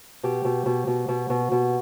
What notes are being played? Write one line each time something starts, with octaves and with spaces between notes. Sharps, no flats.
B2 G4
B2
B2
B2
B2
B2
B2